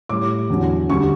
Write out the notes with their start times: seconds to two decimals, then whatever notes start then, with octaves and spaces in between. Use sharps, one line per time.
0.09 A2 G3 D6
0.50 E2 D3 F#3
0.89 D2 D3 G3 C#6